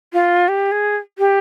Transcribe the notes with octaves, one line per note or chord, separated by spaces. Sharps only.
F4
G4
G#4
G4